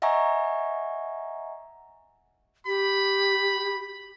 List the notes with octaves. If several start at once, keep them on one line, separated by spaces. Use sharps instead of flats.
D#5 E5 F#5 G#5 A#5 C#6
G4 B5